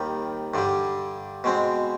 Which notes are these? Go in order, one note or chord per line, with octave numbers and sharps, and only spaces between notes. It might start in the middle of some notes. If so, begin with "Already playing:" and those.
Already playing: D#2 D#3 G3
G2 D3 G3
B2 G#3 C4